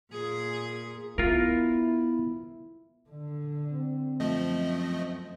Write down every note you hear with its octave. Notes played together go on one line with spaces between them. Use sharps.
A#2 G#4
B3 E4 F4 A#4
D3
C4
F#2 F3 A3 D#5